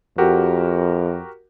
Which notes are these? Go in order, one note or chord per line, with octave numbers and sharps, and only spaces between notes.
F2 F#4 G4 A#4